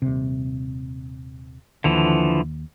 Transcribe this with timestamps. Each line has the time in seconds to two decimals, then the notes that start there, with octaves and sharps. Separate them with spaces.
0.02 D#1 C3
1.84 D#2 D3 E3 F3